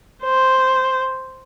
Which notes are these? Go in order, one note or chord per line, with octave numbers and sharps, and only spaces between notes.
C5